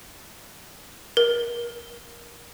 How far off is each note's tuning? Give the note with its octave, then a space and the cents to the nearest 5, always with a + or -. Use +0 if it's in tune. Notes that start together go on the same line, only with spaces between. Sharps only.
A#4 +25